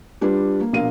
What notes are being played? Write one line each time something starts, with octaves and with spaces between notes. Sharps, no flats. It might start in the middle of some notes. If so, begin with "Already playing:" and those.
G3 D4 F4 B4
A#3
A#1 B2 A#4 F5 D#7